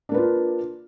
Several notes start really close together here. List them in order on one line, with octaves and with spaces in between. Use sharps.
D4 A#3 B4 F4